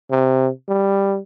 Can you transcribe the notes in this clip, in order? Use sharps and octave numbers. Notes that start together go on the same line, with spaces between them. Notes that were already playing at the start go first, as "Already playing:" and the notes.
C3
G3